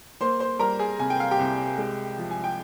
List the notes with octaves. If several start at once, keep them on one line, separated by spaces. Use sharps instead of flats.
A#3 C5 C6
C5 C6
G3 A#4 A#5
G#4 G#5
C3 G#5
G5
F5
G4 G5
C2
G#3
F3
G#5
G5